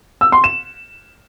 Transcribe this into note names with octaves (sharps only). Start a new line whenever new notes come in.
E6
C6
E7